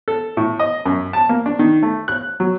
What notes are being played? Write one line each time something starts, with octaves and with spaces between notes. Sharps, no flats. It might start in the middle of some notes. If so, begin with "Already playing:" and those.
A4
A2
D#5
F#2
A5
A#3
D4
D#3
A3
F#6
F#3